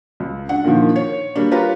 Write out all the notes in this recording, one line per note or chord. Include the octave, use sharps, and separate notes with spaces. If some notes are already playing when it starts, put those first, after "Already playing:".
C#2
D4 F#5
A#2 D3 D#3 F3
C#5
G3 A#3 D4
F4 G4 B4 C#5 A#5